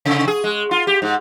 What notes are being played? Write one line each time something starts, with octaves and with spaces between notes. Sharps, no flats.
C3
G#4
G#3
F4
G4
G#2